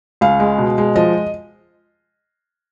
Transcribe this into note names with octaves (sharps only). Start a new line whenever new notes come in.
C#2 F5
G#3
B2
G#3
F3 D#5